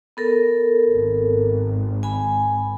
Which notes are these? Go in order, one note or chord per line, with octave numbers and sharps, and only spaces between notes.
B3 A4 A#4
G#1
G#5 B5